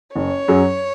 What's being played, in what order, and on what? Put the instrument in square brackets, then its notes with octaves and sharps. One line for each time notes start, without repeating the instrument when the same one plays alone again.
[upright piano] F#1 [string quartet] C#5
[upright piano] F#2 F#3 C#4 G#4